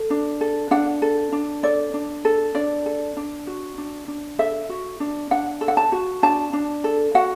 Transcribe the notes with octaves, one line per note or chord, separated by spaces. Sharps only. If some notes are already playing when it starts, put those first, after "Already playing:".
Already playing: A4
D4
A4
D4 F#5
A4
D4
A4 D5
D4
A4
D4 D5
A4
D4
F#4
D4
D4
A4 E5
F#4
D4
D4 F#5
A4
F#5
A5
F#4
D4 A5
D4
A4
F#4 F#5